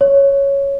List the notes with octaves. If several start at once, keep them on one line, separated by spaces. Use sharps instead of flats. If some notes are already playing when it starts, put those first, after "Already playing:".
C#5